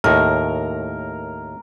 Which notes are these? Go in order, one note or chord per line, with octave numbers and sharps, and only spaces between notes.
D#2 A2 A#4